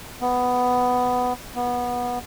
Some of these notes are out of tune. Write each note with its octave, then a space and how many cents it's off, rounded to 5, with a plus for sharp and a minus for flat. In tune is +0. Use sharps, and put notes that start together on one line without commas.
B3 +10
B3 -15